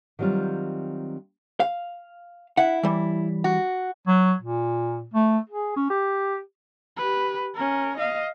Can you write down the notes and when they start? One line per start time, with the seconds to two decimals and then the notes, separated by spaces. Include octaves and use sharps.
0.19 D#3 F#3 G3 C4 F4
1.60 F5
2.57 E4 F#5
2.83 E3 G3
3.44 F#4
4.07 F#3
4.42 A#2
5.14 A3
5.49 G#4
5.76 C#4
5.90 G4
6.97 G4 B4
7.55 C#4 A#4
7.97 D#5 F5